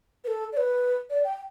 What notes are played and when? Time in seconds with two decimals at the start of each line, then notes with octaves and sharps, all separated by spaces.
0.24 B4
0.28 A4
0.53 D5
0.57 B4
1.10 D5
1.24 G5